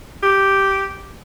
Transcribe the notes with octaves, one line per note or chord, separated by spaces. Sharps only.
G4